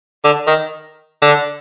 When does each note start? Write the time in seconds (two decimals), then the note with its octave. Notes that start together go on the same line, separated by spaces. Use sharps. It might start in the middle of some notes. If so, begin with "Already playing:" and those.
0.25 D3
0.47 D#3
1.22 D3